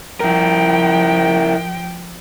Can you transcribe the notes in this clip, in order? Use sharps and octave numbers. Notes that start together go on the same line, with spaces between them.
F3 E4 A#4 G5